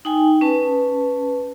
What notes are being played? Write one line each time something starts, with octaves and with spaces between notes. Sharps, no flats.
D#4 G5 G#5
C#4 B4 A5